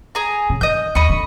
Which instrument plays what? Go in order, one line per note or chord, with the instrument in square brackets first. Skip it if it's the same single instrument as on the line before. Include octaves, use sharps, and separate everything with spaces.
[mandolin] G#4 A#5
[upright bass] C#3
[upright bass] D#3 [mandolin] D#5 G6
[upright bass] D#2 [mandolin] D#5 B5 C#6
[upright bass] D3